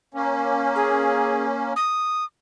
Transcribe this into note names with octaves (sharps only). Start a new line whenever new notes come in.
A#3 C#4
G#4
D#6